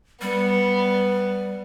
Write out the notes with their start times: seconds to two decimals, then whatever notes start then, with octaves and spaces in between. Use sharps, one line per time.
0.21 G3 B3